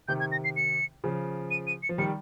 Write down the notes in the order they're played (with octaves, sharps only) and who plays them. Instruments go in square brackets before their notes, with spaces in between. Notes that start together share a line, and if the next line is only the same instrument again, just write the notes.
[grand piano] C3 D#3 [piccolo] G6
[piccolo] G#6
A#6
C7
C#7
[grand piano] C#3 F3
[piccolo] D#7
D#7
C#7
[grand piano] F3
[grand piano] D#3 G3 [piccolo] C#7